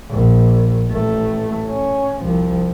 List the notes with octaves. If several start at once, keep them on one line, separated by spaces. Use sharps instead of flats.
A#1
A1 A3
C#4
C2 F3